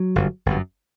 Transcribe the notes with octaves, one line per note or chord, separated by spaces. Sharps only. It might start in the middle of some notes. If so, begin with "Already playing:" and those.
Already playing: F#3
G1 F#2
G1 F#2